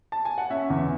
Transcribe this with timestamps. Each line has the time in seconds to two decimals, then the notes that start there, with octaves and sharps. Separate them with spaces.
0.12 A5
0.25 G#5
0.38 F#5
0.50 C#4 E5
0.70 E2